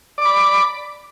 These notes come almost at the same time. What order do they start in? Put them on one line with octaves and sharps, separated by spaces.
D5 D6 B5